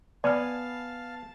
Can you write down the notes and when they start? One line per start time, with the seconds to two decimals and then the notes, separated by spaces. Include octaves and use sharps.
0.24 B3 D5 F5 F#5 G#5 A5 F6